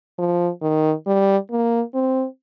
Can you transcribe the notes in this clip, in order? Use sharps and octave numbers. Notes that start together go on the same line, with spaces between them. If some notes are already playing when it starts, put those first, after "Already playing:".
F3
D#3
G3
A#3
C4